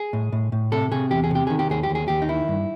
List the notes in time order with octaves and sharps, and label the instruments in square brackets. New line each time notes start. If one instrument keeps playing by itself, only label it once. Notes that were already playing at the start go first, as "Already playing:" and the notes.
Already playing: [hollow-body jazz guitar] G#4
A2
A2
A2
C3 A4
C3 G#4
E2 G4
G#4
C3 G4
D#3 G#4
G4
D#2 G#4
G4
D#2
G#4
D#2 G4
D#4
D#3 E4
G2